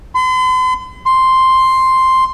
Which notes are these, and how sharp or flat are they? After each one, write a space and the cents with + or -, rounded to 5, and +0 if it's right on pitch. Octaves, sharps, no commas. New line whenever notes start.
C6 -45
C6 +0